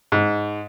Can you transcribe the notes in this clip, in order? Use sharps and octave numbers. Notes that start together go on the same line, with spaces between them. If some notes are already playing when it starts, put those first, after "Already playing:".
G#2